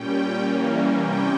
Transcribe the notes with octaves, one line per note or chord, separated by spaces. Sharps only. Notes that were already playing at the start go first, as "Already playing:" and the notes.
Already playing: A#2 G3 C#4 G5
E3 G3 A#3 C#4
C3 G3 C#4 G5